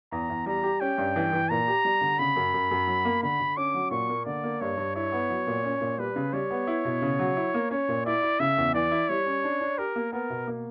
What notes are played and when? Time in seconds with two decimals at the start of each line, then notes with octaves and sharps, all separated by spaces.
0.12 E2 A#5
0.29 E2
0.46 G3 A#5
0.63 G4
0.80 C#4 G5
0.98 G2
1.16 E3
1.33 E3
1.49 A#2 A#5
1.68 G4
1.85 G3
2.01 D3
2.19 C#3 B5
2.36 F#2
2.54 F#2
2.71 F#2
2.87 F#3
3.05 A#3
3.23 D3 B5
3.40 D3
3.57 C#4 D6
3.74 F#3
3.91 A#2 C#6
4.09 A#3
4.26 D3 D5
4.43 A#3
4.61 G2 C#5
4.77 G2
4.95 E4 C#5
5.12 B3
5.30 F#3
5.47 A#2
5.64 C#4
5.81 A#2
5.98 G3 B4
6.16 C#3
6.33 G3 C#5
6.51 B3
6.67 E4
6.85 B2
7.02 C#3
7.19 F#3
7.36 E4
7.54 A#3
7.71 C#4 C#5
7.88 A#2
8.06 E4 D5
8.22 E4
8.40 C#3 E5
8.57 E2
8.74 E3 D5
8.91 E4
9.09 G3 C#5
9.26 C#4
9.44 D4
9.61 D4
9.78 G4 A#4
9.96 A#3
10.13 B3 A#4
10.30 B2
10.47 A#3